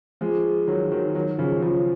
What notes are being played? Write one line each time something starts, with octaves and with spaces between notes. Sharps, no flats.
F3 G#3
D#3 F#3
D#3 F#3
D#3 F#3
C#3 F3
C#3 F3